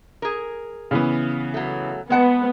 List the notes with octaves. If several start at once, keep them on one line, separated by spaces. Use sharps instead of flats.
G#4 A#4
C#3 E3 B3
F#3 A3
G#3 B3 F#5 A5